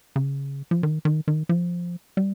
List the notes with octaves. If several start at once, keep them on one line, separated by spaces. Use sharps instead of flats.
C#3
F3
D#3
D#3
D#3
F3
G3